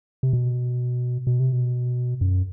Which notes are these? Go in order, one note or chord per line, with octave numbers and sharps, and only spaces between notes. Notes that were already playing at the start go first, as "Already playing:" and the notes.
C3
B2
B2
C3
B2
F#2